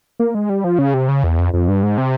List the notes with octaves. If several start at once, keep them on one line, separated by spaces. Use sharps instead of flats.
A#3
G#3
G3
F3
C#3
C3
C#3
E2
F2
F2
G2
G#2
C3